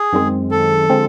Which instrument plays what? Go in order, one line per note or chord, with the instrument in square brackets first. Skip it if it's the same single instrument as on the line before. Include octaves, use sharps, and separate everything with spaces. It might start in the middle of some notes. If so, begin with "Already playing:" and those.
Already playing: [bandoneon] G#4
[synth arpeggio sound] F#2 D#3 G#3 C4
[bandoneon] A4
[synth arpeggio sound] D3 F3 G#3 C4